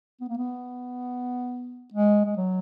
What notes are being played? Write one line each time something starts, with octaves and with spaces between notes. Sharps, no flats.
B3
A#3
B3
G#3
G#3
F#3